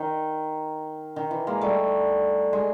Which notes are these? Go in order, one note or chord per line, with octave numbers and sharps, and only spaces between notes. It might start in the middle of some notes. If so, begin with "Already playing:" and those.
Already playing: D#3
D#3
E3
G#3 A#3
G3 A3
G#3